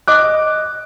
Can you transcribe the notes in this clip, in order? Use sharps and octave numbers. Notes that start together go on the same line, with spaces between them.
D#5 D6 F#6